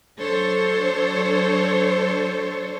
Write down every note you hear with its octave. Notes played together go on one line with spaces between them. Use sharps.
F#3 D4 A4 C5 C#5